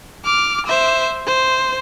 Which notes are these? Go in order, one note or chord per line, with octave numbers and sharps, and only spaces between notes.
D6 F6
C5 E5
C5